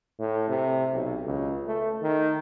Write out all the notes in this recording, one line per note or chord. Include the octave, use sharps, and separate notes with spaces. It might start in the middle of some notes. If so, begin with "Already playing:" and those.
A2
C3
B1
C#2
A3
D#3